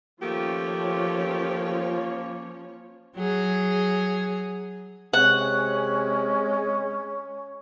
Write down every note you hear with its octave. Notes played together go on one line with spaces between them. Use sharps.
D#3 F3 A3 A#3 C#4 G4 C#5
F#3 G#4
C3 G#3 C#4 F#5